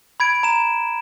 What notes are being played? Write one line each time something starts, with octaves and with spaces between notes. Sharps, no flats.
B5 G#6 D7
A#5 E7